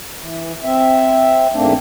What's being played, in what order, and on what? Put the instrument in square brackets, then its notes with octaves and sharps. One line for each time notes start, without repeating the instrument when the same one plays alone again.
[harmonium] E3
C4 E5
E2 G#2 A3 A#3 C4 D4